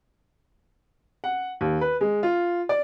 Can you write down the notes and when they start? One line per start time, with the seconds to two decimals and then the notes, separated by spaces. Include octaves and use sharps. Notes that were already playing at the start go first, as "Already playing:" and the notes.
1.24 F#5
1.61 D#2
1.81 B4
2.01 G#3
2.23 F4
2.69 D5